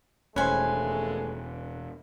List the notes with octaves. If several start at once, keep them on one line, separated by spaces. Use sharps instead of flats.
E1 D#2 G#3 A3 C#4 B4 C5 G#5